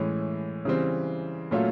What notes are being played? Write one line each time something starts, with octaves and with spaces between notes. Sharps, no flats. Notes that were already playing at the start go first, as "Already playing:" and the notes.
Already playing: A2 E3 G#3 C#4
C#3 E3 G3 C4
A#2 F#3 A3 C#4 F4